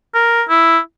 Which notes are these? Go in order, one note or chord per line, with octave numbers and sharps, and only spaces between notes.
A#4
E4